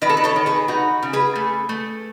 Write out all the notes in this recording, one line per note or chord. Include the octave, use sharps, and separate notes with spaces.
D#3 B4 D#5
A4
B4
A4 C#5
D#3
G#4 B4
D#4 F#4
C#3
G#4 B4
A3
A3